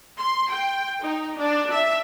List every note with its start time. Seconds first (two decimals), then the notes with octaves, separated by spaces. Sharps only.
0.19 C6
0.50 G5
1.03 D#4
1.38 D4
1.71 E5